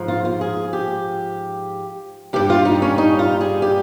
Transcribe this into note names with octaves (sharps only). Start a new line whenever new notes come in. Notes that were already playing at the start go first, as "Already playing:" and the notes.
Already playing: G#2 F3
F4
F4
G#4
G4
G2 G3 G4
F4
D#4
C#4
D#4
F4
G#4
G4